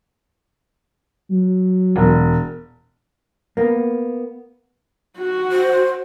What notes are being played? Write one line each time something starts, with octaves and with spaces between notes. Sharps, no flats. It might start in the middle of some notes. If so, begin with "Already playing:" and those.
F#3
E1
A#3 B3
F#4
C5